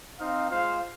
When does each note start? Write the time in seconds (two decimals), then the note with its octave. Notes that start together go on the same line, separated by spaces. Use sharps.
0.17 C4 D#4 C5 F5
0.48 G#3 F4 C5 F5